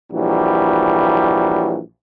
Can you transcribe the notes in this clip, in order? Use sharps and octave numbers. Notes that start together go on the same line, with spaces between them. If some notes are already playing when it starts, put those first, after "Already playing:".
A#1 E3 F#3 G3